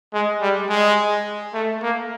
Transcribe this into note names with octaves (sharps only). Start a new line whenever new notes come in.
G#3
G3
G#3
A3
A#3